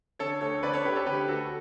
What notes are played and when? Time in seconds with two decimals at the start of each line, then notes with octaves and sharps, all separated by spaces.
0.19 D3 A4 C#5
0.41 D2 A4 C#5
0.63 D3 B4 D5
0.73 A4 C#5
0.85 D2 G4 B4
0.95 A4 C#5
1.06 D3 G4 B4
1.28 D2 F#4 A4